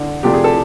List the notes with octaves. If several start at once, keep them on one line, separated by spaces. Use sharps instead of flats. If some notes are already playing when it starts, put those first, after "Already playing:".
Already playing: D3
C3 F3 A3 D4 G4
G#4
A4